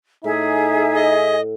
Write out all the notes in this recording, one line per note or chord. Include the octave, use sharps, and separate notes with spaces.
A2 D#4 G#4 E5
D#5